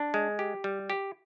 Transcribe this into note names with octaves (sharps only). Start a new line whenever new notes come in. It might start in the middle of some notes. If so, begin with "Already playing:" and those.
Already playing: D4
G#3
G4
G3
G4